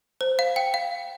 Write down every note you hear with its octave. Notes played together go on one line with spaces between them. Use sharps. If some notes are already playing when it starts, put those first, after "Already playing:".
C5
F5
G5
F5